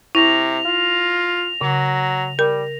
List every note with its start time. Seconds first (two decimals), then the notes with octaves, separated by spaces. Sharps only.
0.15 C3 E4 A#6 F7
0.66 F4
1.61 C#3 F#3
2.39 G3 A#4